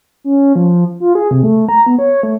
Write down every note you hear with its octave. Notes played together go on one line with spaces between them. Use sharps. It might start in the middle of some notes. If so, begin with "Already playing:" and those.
C#4
F3
F4
G#4
C3
A3
A#5
B3
C#5
A3